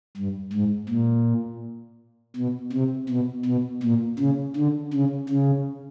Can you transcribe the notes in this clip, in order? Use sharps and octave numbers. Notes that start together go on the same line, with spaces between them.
G2
G#2
A#2
B2
C3
B2
B2
A#2
C#3
D3
C#3
C#3